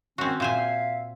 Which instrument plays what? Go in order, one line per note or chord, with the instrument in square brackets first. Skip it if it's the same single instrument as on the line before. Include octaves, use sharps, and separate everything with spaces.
[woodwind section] D#3 C#4 [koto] C4 F#4
[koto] A#2 C5 G#5 [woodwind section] E5 F5